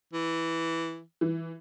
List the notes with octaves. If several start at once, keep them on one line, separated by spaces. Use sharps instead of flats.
E3
E3